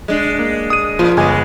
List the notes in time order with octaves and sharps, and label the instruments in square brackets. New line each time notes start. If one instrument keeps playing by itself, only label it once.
[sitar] G#3 D4
[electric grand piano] A#3
D#6 D#7
[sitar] A#2 [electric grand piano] F3 F4
[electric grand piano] G1 G#5 G#6 [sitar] G#3 B3